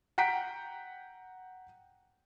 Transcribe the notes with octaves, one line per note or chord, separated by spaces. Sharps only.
F#5 G5 A#5 B6 D7